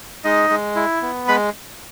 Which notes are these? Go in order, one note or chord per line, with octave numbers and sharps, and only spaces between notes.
G#3 D#4 D#5
G#3
E4
B3
G#3 B4 B5